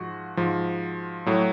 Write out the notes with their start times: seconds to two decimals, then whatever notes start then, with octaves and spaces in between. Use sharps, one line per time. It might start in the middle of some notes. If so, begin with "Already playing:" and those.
Already playing: G#2 F3 F#4
0.37 G#2 F3
1.26 A2 F#3